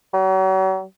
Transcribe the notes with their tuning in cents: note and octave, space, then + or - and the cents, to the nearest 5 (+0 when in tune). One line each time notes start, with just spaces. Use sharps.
F#3 +40